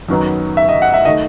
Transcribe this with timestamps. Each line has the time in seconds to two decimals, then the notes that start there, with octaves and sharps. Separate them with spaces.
0.08 F#2 D#3 F#3 B3 D#4
0.57 E5
0.69 D#5
0.82 F#5
0.94 E5
1.05 D#3 A3 D#5